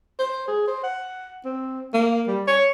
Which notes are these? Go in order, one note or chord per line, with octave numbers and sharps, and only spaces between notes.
C5
G#4
C5
F#5
C4
A#3
G3
C#5